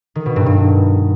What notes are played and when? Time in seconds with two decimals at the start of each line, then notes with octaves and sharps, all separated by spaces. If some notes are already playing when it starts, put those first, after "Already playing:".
0.15 D#3
0.26 B2
0.36 G2
0.46 G2